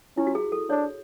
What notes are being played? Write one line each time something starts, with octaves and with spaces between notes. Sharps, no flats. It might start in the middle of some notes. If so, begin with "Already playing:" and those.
C#4 E4
F#4
G#4
A4
D4 C#5